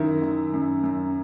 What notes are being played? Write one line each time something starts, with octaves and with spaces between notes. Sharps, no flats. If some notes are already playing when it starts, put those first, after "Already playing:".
Already playing: F#2 D#3 E4
D#3
F#2
F#2